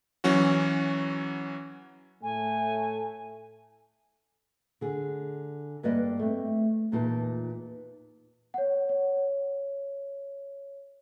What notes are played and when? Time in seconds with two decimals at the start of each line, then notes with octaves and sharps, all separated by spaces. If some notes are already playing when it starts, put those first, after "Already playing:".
0.24 E3 F#3 C#4 F#4
2.23 A2 A3 G#5
4.81 D3 G#4
5.83 G2 A#3 B4 D5 D#5
6.19 A3 C4
6.92 E2 A#2 D#4 F4 B4 A5
8.54 C#5 F#5
8.89 C#5